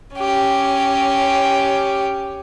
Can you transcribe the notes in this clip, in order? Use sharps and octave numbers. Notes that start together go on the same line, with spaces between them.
C#4 G4